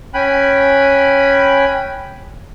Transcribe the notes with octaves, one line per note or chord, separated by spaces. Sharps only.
C#4 G5 G#5 B5 F#6